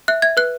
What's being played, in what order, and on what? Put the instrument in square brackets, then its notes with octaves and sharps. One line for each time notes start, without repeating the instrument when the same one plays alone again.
[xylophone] E5 F#6
E5 G#6
B4 F#6